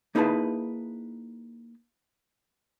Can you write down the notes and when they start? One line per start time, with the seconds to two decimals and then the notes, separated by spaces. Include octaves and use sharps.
0.15 A#3 D#4 E4 G#4 B4 A5